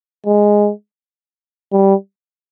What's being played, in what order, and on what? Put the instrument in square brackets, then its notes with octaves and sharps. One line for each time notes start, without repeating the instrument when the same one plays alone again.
[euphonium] G#3
G3